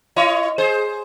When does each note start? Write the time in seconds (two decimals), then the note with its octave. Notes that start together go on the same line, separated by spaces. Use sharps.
0.16 E4 C#5 D#5
0.58 G#4 C5